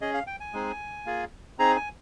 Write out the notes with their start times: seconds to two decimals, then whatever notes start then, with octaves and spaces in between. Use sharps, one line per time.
0.01 C#4 G#4 D#5
0.14 F5
0.27 G5
0.40 G#5
0.53 G#3 C4 D#4 G#4
1.06 A#3 F4 G#4
1.59 C4 D#4 G#4 A#5
1.76 G#5